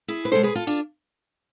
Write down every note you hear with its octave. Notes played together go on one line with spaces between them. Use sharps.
E4 G#4
B4
B2 G#3 A4 C5
G#4 B4
F4 A4
D4 F4